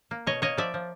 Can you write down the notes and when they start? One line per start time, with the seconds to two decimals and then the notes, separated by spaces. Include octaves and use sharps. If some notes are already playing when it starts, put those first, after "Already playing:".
0.11 A#3
0.26 B2 C#5 D#5
0.42 A#3 C#5 D#5
0.57 F3 D5 E5
0.74 F3